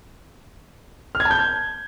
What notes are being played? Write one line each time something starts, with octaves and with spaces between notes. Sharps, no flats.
F6
G#6
A5
G6